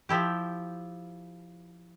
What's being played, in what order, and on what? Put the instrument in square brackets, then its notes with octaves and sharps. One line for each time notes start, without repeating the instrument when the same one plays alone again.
[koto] F3 E4 G4